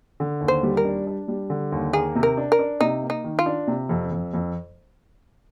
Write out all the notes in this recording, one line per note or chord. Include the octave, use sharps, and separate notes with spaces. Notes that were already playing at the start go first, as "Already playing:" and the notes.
D3
D#2
C5
G3
A#4
D4
D4
G3
D3
D#2
A#3 G#4
C3
A#4
D4
A#4
D4
C3 D#4
A#3
D#4
D#3
F4
D4
C3
F2
F2
F2